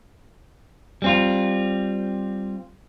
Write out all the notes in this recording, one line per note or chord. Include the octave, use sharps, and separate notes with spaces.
G3 C4 F4